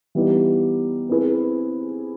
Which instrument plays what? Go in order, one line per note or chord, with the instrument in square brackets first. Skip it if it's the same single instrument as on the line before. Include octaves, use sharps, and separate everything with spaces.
[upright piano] E3 G3 B3 D#4
C4 E4 G#4 B4